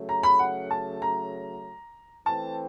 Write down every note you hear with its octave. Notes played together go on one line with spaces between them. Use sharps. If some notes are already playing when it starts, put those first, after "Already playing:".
Already playing: C#3 F#3 A3
A#5
B5
F#5
A5
A#5
E3 A3 C4 A5